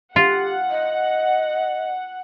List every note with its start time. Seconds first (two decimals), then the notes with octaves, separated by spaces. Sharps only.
0.16 F4 G4 F#5
0.71 D#5